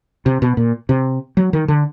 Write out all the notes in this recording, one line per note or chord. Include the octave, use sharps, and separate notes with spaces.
C3
B2
A#2
C3
F#3
D#3
D3